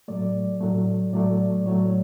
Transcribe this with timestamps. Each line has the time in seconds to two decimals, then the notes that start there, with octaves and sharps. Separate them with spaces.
0.08 A2 F#3 A3 D5
0.61 A2 F#3 A3
1.13 A2 F#3 A3 D5
1.66 A2 F#3 A3 C#5